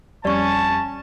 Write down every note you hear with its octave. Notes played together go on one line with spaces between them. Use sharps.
F2 G3 C#4 D5 A5 C#6